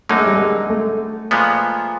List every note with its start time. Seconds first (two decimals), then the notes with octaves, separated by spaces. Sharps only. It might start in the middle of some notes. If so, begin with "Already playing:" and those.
0.09 F#2 D3 F#3 A3 A#3 D#4
0.18 G#3
0.26 G3
0.35 G#3
0.70 A3
1.31 A#2 F3 G#3 B3